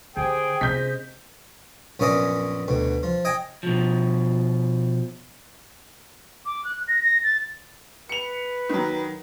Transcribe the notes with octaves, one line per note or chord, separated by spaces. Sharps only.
D3 G4 G#4 C5 G5
C3 G#3 C#4 C5 D#5 G6 B6
A#1 F#2 B3 C#4 D5 D#5
D2 B2
F3
D#5 G5 G#5
B2 F3
D6
F#6
A#6
A#6
A6
B4 C#7 F7
D#3 F#3